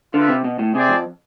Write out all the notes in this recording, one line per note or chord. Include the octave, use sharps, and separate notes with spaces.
D3 F4 B4 E5
C3
B2
A2
C3 C4 G#4 D5
F2